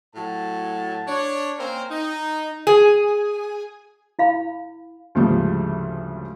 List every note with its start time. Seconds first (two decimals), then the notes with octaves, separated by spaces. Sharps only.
0.15 A2 F#3 A5
1.08 D4 C#5
1.58 A#3 C4 C#4 A#4 C5
1.91 D#4
2.67 G#4
4.19 E4 F5 B5
5.15 D2 G#2 C#3 F3 G3 A3